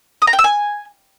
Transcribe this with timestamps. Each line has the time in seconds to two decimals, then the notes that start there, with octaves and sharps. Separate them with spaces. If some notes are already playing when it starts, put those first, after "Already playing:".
0.22 D#6
0.27 A#5
0.33 G5
0.39 E6
0.44 G#5